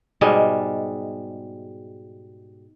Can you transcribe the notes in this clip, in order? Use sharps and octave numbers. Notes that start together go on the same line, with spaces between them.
G#2 B2 G3 G#3